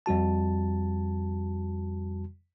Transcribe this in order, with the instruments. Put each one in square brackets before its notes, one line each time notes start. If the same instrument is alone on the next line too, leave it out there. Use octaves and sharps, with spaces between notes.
[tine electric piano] F2 G3 F#4 A5